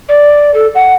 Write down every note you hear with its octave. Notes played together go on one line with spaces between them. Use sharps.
D5
A4
F#5